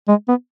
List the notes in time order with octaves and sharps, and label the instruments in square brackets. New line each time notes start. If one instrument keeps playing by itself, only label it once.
[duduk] G#3
B3